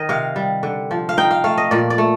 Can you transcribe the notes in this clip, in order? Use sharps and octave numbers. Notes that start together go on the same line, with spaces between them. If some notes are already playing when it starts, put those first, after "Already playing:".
Already playing: D#3 D#5
C3 F5
G3
D3
F3
F5
D#4 G5
F5
A3 F5
D#5
A#2 D5
D5
A3